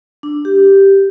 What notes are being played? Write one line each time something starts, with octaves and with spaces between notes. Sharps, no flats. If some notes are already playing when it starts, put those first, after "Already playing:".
D4
G4